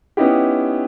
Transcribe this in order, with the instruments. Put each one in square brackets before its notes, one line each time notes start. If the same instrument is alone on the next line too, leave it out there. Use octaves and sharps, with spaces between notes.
[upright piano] B3 C#4 D#4 E4 G4